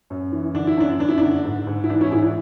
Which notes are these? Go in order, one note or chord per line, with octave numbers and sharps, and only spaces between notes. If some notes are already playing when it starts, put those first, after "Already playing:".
F#2
E3
D3 D4
E4
F#2 D4
F#2 D4
E4
D3 D4
G#2
G#2
E4
E3 D4
C#4 E4
G#2 E4 G#4
D4